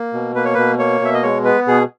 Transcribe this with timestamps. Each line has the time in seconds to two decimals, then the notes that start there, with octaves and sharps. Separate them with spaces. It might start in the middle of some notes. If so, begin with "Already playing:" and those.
Already playing: A#3
0.13 B2
0.35 A#3 B4
0.45 C#5
0.54 B2 B4
0.79 A#3 C#5
1.01 B2 E5
1.14 D#5
1.23 G#3 C#5
1.44 B3 B4
1.67 B2 G#4